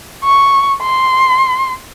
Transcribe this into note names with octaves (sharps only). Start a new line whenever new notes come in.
C#6
C6